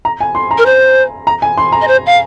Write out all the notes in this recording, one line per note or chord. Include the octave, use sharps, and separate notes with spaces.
A#5
G#5
C6
A#5
A#4
C5
A#5
G#5
C6
A#5
D#5
C5
F5